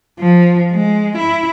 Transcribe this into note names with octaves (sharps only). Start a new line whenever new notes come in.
F3
G#3
E4